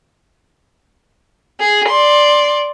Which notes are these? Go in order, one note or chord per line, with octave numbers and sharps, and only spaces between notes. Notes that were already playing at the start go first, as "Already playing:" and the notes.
G#4
D5 C6